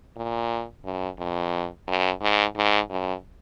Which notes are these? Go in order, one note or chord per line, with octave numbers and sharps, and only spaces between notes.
A#2
F#2
F2
F#2
G#2
G#2
F#2